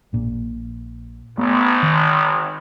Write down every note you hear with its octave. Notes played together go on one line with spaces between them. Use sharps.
A#1 A#2
G#1 A3 B3
D#3